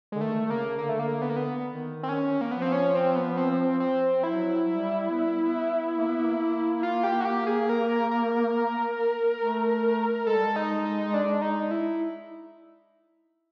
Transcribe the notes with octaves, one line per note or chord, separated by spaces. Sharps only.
D3 G#3
D#3 A3
C#3 A#3
D3 A#3
A3
A#3
B3
A#3
B3
D#3
C4
C#4
A#3
F3 B3
C4
C#4
C4
B3
C4
C4
F#3 E4
G3
B3
B3
A#3
B3
A#3
F4
G4
F#4
G4
G#4
A#4
A#4
A3
G#3 A4
G3
G#3
D#4
D#4
D4
D#4
E4